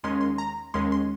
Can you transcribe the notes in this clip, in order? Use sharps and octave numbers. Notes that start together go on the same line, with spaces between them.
D#2 D#3 G#3 C#4 C6
C6
A#5
D#2 D#3 G#3 C#4 C6
C6